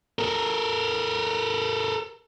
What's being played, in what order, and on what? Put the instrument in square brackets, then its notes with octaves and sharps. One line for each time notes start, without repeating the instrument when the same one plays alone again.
[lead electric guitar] A4 A#4